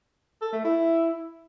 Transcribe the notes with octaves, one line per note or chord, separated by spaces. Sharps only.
A4
A3
E4